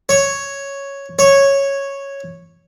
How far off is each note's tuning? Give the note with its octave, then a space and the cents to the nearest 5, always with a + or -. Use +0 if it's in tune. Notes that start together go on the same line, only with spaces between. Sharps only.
C#5 +0
C#5 -5